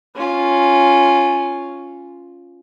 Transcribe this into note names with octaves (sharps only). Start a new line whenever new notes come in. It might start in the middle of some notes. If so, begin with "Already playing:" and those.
C#4 F4